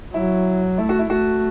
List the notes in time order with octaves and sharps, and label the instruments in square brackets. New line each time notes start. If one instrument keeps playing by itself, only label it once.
[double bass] F#3 [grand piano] E4
[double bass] A3 [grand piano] E4
[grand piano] F#4
E4
[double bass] A3 [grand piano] F#4